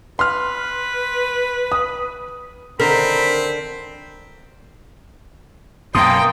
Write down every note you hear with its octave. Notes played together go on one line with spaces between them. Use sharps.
B4 C6 F6
D#6
D3 D#3 C4 A#4 B5
F#2 B2 A#3 G5 C6 D#6